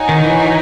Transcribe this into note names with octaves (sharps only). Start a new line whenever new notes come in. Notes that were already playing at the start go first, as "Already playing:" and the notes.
Already playing: D#4 F#4 C#5 G#5
D#3
E3